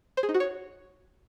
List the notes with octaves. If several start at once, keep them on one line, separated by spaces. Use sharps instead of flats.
C5
G#4
D#4
F#4
C#5